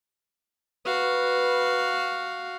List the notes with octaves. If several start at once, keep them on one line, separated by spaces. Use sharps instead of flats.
F#4 B4 F5